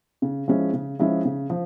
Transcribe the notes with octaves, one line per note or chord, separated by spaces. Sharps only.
C#3
F3 G#3 C#4 E4
C#3
F3 G#3 C#4 E4
C#3
F3